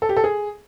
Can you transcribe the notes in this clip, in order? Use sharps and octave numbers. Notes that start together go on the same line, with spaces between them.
A4
G4
A4
G#4